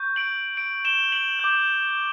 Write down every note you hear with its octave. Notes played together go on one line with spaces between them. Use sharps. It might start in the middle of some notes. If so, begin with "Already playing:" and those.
Already playing: C#6 G6
D7 F#7
D7 F#7
E7 G7
D7 F#7
D6 G6